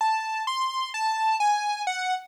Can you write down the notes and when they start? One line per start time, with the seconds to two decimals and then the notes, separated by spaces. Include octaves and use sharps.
0.01 A5
0.47 C6
0.94 A5
1.40 G#5
1.87 F#5